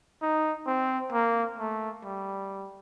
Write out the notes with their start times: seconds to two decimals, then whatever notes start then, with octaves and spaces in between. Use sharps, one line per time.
0.22 D#4
0.67 C4
1.13 A#3
1.58 A3
2.04 G3